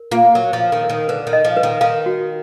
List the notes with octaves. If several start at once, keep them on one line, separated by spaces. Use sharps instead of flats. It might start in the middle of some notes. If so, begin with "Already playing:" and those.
Already playing: A#4
A#3 F4
F#3 A#4
F3
F5
D#3
A#4
D#3
D3 B4
D#3
D#5
F3
B4
D#3
D#3 F5
F#4